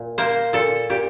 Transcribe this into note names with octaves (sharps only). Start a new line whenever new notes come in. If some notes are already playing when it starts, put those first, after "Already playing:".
Already playing: A#2
A#3 C5
A#2 A4
A#2 G4